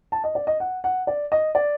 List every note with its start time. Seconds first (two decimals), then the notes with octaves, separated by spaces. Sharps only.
0.12 A5
0.24 D#5
0.35 D5
0.47 D#5
0.60 F#5
0.84 F#5
1.07 D5
1.32 D#5
1.55 D5